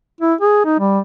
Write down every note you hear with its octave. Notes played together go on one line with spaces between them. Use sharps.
E4
G#4
D#4
G3